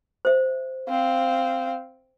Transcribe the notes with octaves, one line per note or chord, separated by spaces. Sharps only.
C5 E5
C4 F5